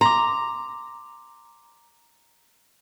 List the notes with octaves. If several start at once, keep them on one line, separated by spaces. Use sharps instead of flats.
A#5 C6 D6